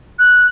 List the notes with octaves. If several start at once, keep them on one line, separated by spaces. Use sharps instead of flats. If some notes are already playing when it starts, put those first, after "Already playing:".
F#6